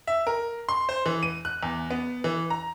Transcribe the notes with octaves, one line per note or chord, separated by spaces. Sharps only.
E5
A#4
C6
C5
E3
D#7
F#6
E2
B3
E3
A#5